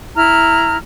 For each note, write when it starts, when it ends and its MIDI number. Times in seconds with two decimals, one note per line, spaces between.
0.16 0.76 64
0.16 0.76 82
0.16 0.76 89